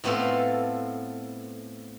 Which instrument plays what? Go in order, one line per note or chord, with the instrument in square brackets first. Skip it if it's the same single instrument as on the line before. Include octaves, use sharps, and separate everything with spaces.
[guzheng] A2 A3 B3 C4 F4 A4